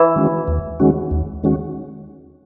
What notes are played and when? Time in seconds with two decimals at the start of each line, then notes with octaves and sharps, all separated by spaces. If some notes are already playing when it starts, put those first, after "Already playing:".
Already playing: E3
0.16 D#3 G#3 C#4 F#4
0.48 D#2
0.80 D#3 G#3 C#4 F#4
1.11 D#2
1.43 D#3 G#3 C#4 F#4